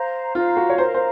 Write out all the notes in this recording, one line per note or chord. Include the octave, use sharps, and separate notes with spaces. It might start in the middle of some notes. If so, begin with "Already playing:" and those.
Already playing: C5 F5 A#5
F4 C5 F5 A#5
F#4
C#5
A#4 C5 F5 A#5
C5